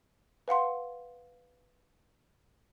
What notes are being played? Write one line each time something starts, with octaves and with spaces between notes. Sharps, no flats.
B4 F5 F#5 C6